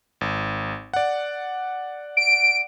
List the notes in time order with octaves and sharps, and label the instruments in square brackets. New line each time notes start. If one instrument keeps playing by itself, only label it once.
[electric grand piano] G#1
D5 F#5
[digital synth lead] D7